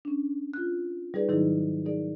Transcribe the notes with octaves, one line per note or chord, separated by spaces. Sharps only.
C#4 D4
F4 F#6
G3 D#4 G#4 B4 D5
G#2 D#3 F#3 D#4 E4 G#4
D#4 G#4 A#4 D5